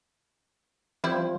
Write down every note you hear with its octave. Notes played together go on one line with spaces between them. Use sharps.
F3 G3 C4 E4